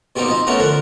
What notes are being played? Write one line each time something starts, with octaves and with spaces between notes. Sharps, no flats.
B2 G3 A#3 C4 D#4
F3 C4 D#4
A3 B3 C#4 F#4 A#4
D3 F3 A#4 F#5